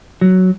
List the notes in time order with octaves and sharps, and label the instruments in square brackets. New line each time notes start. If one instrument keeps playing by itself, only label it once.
[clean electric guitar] F#3